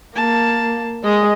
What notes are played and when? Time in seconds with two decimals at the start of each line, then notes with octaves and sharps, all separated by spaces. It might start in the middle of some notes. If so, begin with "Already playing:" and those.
0.16 A#3 A5
1.04 G#3 D#5